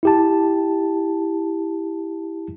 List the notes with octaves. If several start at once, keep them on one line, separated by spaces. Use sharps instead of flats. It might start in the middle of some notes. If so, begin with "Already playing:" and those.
E4 G4 A5